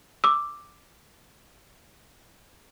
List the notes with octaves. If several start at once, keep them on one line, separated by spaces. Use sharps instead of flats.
D6 E6